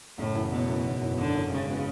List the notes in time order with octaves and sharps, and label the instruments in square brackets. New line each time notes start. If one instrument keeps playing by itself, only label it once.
[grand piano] F#1 [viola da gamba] A2
[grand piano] F#2 E3
[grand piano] F#1 [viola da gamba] B2
[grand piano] F#2 E3
G#1
F#2 E3
[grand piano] G#1 [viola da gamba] D3
[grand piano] F#2 E3
[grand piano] G#2 [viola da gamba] C#3
[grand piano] G#3 B3 F#4 B4